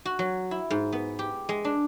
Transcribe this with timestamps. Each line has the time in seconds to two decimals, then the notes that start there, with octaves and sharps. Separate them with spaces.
0.05 F#4
0.19 F#3
0.51 E4
0.70 G#2
0.92 B3
1.19 G4
1.49 G#3
1.65 D4